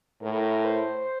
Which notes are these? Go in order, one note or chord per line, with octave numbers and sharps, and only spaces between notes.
A2 A#4
C5